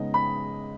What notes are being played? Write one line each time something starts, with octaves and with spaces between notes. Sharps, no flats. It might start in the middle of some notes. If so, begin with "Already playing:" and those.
Already playing: C#3 G#3 B3 D#4 D#5
B5